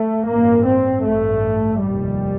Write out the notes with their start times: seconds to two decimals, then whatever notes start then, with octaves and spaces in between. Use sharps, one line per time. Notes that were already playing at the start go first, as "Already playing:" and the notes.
Already playing: A3
0.26 A1 G2 A#3
0.65 C4
1.04 A1 G2 A3
1.83 F1 D#2 G3